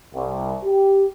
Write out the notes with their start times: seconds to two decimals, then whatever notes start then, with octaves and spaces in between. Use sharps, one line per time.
0.15 C2
0.64 G4